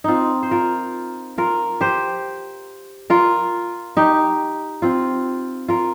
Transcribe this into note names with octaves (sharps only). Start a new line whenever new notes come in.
C4 D#4 F4
C5
F4 A#4
F4 A#4
G4 C5
F4 A#4
D#4 G4
C4 F4
F4 A#4